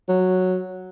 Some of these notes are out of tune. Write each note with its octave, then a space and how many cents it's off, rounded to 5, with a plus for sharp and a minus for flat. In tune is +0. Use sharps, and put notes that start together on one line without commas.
F#3 -5